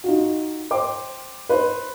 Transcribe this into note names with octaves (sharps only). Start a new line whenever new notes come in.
D#4 F4 F#4
C5 G5 D6
B4 C5